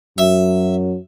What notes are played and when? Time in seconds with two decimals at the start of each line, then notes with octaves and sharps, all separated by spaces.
0.18 F#2 F#3 E5